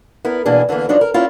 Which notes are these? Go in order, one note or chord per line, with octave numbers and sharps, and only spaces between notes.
B3 E4 A#4
B2 E3 A#3 D4 G#4
D3 E3 G#3 A#3 B3
F3 F#3 D4 D#4
A#4
A#3 C#4 E4 F4 A#4